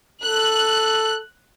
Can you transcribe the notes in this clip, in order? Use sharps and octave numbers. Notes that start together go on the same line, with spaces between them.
A4 F#6